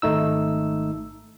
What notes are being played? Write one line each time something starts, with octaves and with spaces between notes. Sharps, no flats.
G#1 A3 D#4 E6